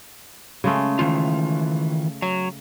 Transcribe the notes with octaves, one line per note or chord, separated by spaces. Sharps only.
C#3 G#3 A3
D#3 E3 F4
F#3